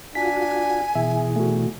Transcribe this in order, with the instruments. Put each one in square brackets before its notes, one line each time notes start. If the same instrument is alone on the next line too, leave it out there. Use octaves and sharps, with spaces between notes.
[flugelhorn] D4 [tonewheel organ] F4 F#4 [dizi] G#5 [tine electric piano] B6
[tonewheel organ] B2 E3 [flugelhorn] G#4 [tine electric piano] E5
[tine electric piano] A3 F#4